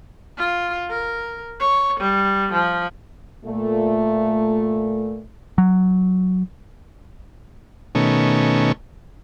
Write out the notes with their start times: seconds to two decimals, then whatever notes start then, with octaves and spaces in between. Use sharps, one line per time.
0.37 F4
0.90 A#4
1.59 C#5
2.00 G3
2.53 F3
3.45 A#2 A3
5.58 F#3
7.95 B2 D#3 A3 C#4